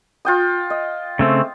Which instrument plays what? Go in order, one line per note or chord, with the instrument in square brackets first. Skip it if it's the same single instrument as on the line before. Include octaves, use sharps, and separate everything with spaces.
[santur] F4 G5 D#6
D#5
[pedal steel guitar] C#3 A3 C4